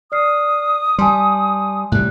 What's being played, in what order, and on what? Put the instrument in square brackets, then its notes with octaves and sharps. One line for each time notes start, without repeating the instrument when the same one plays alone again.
[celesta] D5 F6 C7 [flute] D#6
[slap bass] G3 [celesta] G#5 A5 C6
[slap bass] A2 C3 G3 [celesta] F#6